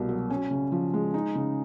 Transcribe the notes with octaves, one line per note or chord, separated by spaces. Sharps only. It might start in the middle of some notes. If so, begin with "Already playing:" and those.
Already playing: C2 B2 A#3
F#3
C#4
C#3
F3
G#3
D#4
C#3